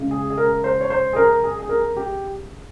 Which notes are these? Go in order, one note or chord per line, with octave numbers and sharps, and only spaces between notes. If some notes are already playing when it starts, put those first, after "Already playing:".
Already playing: C#3 G#3
G#4
G#4
A#4
C5
C#5
C5
G#4
A#4
G#4
G#4
A#4
G4